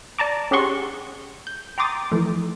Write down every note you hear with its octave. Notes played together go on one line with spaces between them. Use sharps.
D5 A5 A#5 D6
C#4 G4 G#4 F#5 C6 C#6
G6
G5 A#5 C6 D6 D#6 A6
E3 F3 A3